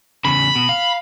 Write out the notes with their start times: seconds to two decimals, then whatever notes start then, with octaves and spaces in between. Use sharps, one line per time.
0.25 E2 C#3 B5
0.55 B2
0.69 F5